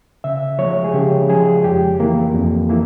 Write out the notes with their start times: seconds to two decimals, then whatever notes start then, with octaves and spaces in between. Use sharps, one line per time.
0.24 C#3 E5
0.58 F3 G#3 C#5
0.84 G#4
0.94 C#3 G4
1.29 F3 G#3 G#4
1.64 F2 G4
1.99 E3 A#3 E4
2.34 F2
2.69 E3 A#3 E4